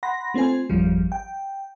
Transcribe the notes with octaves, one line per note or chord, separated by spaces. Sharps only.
F#5 B5 C6 A#6
A3 C4 F4 C5 G#5
G#1 F2 F3 G3
G5